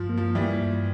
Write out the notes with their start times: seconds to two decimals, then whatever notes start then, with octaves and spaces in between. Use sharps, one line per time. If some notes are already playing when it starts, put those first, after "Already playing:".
Already playing: G2 F3
0.09 A#3
0.17 F3
0.35 E3 G3 A#3
0.61 G2